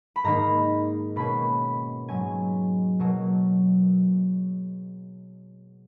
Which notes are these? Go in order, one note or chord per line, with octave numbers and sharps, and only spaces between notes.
B5
G#2 D#3 A#3 D#4 A#5
B2 A#3 C#4 B5
G#2 F#3 C#4 G#5
B2 F#3 A#3